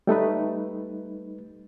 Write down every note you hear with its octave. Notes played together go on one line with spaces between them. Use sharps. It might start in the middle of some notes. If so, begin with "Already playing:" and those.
G3 A3 D#4 B4